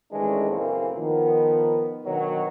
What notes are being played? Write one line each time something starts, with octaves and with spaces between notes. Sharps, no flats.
D#3 E3 G#3 A3 C#4 D4
F#2 A2 C#3 E3 A#3 C4
D#3 F3 B3
D2 B2 D#3 F#3